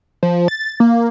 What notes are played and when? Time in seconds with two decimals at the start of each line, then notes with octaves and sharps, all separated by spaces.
0.23 F3
0.48 A6
0.80 A#3